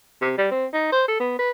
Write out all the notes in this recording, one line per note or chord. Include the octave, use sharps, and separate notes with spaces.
C3
G3
C4
D#4
C5
A4
B3
B4